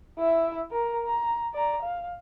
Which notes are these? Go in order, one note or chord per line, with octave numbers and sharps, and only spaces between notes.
E4 E5
A#4 A#5
A#5
D5 A#5
F5